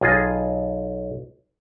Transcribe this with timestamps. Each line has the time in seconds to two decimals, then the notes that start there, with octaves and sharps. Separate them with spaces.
0.01 B1 F4 G#4 D#5